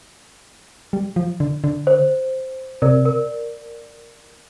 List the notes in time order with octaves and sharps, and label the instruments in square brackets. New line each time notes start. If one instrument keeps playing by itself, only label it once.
[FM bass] G3
F3
D3
D3
[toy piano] C5
[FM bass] C3 [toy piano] A#4 D5
[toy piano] A#4